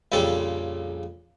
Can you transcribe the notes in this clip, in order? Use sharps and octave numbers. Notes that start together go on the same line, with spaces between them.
A#1 F2 C#3 G3 A4 G5